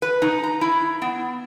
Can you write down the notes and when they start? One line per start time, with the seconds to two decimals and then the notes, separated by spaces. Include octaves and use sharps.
0.02 B4
0.22 D#4
0.43 A#5
0.61 E4
1.02 B3